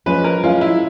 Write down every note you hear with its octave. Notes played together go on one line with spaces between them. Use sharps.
F3 G#3 C#4 B4
A#4
F3 G#3 C#4 F4
E4